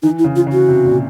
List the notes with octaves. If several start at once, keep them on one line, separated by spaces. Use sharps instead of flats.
E3 D#4
E4
C#3
F4
C#3
F#4
C3
A#2